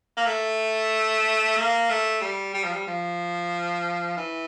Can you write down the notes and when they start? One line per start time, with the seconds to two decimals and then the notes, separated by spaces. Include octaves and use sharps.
0.17 A#3
0.26 A3
1.57 A#3
1.90 A3
2.21 G3
2.54 G3
2.64 F3
2.73 G3
2.87 F3
4.17 E3